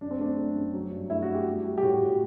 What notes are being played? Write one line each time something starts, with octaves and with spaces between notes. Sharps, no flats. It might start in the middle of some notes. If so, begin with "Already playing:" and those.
F#2 D4
C4
A3 D4
A3
F#2
F#3
G2
A3 E4
F#4
A3
G4
G3
G3
G4
A2 F#4
A2